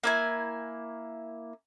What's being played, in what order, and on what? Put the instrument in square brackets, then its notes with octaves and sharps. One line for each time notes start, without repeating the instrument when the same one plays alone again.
[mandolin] A#3 E4 G#5